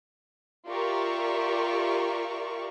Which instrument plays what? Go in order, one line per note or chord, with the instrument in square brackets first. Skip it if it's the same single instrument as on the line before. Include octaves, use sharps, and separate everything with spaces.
[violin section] F4 G4 A#4 D5 E5 C#6